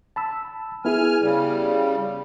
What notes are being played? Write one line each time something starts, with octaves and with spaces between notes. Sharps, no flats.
A5 B5 E6
B3 E4 G#4 G#5 F6
C#3 G3